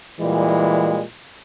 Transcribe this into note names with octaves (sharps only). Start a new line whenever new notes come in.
A#2 E3 G3 G#3